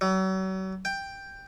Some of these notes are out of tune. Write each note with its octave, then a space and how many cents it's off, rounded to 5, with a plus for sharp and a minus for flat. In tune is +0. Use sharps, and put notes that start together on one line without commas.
F#3 +40
G5 +5